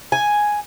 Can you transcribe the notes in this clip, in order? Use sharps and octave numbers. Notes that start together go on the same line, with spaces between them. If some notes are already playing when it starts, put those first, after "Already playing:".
G#5